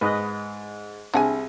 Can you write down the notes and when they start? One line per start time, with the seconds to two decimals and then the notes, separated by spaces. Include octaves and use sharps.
0.01 G#2 B4 D#5
1.14 C2 D4 G#4 F#5 G#5